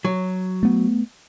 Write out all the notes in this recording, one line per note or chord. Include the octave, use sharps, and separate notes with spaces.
F#3
A3 B3